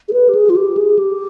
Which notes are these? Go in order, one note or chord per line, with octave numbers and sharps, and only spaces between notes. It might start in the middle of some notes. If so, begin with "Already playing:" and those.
G#4
B4
G4
G#4
F4
G4
G#4
G4